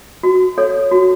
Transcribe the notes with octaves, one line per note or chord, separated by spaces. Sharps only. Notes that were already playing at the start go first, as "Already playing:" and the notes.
F#4
A4 C#5
F#4